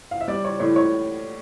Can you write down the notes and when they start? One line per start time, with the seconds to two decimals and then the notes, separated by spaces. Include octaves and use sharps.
0.11 F5
0.21 E5
0.28 G3 D5
0.45 C#5
0.60 A2 C#5
0.76 C#5